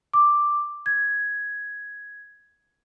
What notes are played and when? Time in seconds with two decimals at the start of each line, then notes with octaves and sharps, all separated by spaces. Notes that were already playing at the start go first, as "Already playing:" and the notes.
0.13 D6
0.86 G#6